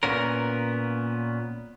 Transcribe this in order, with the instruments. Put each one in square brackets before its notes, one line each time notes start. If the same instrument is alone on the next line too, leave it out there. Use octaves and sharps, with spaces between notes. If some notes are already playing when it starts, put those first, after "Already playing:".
[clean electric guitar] A#2 B3 C#4 A#4